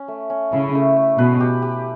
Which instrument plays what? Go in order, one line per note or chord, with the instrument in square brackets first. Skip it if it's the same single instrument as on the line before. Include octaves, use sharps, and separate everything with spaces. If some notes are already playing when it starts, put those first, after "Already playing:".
Already playing: [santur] C#4
A3
C#4
[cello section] C#3 [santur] E4
[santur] A3
A3
[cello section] B2 [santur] B4
[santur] G4
G4